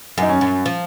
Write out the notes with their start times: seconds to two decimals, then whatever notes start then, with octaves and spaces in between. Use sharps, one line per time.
0.18 F#2 D#4
0.29 C#4
0.41 F#2
0.66 F3